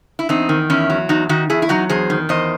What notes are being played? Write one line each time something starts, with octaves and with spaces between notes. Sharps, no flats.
E4
E2 C4 D#4
D#3
E2 C#4 E4
F#3
E2 D#4 F#4
D#3 D#4 F#4
E2 E4 G#4
E4
F#3 D#4 F#4
E2 G#4 C5
D#3
E2 C5 D#5